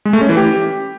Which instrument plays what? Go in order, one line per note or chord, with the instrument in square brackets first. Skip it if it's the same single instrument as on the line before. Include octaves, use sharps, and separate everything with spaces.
[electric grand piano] G#3
A3
C#4
E3
G4